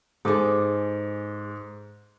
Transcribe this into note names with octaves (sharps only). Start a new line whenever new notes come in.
G#2 G#4 A4 D6